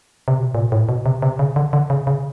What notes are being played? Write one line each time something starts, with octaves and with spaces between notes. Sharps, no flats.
C3
B2
A#2
A2
B2
C3
C3
C#3
D3
D3
C#3
C#3